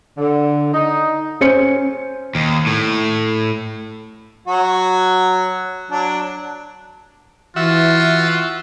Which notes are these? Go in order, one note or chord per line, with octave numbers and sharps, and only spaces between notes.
D3
D#4
C#4 C5 C#7
D#2
A2
F#3 F#4
F#3 D4
E3 F4 F#4 E5